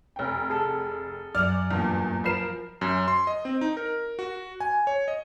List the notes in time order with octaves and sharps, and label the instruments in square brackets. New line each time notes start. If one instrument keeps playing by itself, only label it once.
[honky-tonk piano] F1 G5
[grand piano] G#4 A4
[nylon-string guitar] F#2 F#3 [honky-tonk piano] D5 [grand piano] F6 F7
[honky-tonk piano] E2 [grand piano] G2 A#2
[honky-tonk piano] F3 A#4 E7 [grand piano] B5 C7
[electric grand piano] F#2
C6
D#5
C4
D#4
A#4
F#4
G#5
C#5
D#5